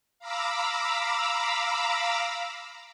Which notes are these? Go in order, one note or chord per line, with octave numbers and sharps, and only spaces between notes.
F5 A#5 B5 D6 E6